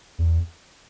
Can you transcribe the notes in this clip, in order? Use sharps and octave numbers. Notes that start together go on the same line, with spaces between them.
E2